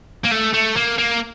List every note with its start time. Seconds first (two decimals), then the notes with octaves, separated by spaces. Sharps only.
0.25 A#3
0.32 A3
0.54 A3
0.76 A#3
0.98 A#3